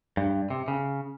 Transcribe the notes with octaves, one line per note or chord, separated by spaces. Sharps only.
G2
C3
C#3